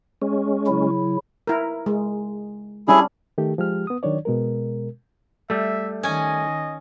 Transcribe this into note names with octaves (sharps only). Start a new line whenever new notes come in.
G#3 C#4
C#3 F#3 E4
E4 A#4
G#3
G3 C#4 D4 E4 G#4
D#3 A3 G4
F3 G#3 G4 F6
B3 D#6
D#3 F#3 D4 C#5 D5
B2 G#3 A#4
G3 A3 E5
D#3 C#4 D#5 G#5